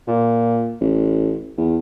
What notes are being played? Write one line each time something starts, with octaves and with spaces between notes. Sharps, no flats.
A#2
A1
E2